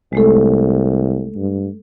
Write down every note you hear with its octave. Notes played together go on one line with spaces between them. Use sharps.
C2 G#3 A3 A4
G2